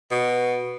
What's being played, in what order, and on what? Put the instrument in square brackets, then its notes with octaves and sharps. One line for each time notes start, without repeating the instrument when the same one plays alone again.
[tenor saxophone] B2